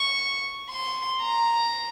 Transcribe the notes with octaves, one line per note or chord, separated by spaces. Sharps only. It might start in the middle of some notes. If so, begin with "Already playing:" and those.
Already playing: C#6
C6
A#5